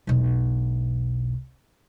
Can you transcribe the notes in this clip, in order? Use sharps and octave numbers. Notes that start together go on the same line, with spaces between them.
E1 B1